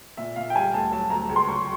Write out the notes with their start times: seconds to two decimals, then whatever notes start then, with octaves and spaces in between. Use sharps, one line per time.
0.17 A#2 E5
0.36 A#2 F5
0.50 G5
0.55 G3 G#5
0.74 D2 A5
0.92 F#3 A5
1.10 D2 A#5
1.29 C#2
1.36 C6
1.49 F#3 C#6